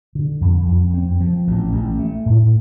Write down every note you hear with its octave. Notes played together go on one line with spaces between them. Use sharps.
D3
F2
F2
C4
F3
A1
A1
A3
A2